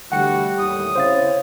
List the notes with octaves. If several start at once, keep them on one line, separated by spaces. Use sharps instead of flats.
D3 E3 G3 A3 F#4 F#5 G5 C#7
D#2 A2 D#6
C#3 C4 E4 C5 C#5 F5 A6